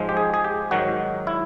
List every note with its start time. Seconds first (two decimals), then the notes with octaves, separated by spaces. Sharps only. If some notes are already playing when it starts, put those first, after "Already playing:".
Already playing: G#2 F3 G#3
0.09 G4
0.17 G#4
0.34 G#4
0.44 G4
0.71 G#2 D#3 F#3 F#4
1.27 E4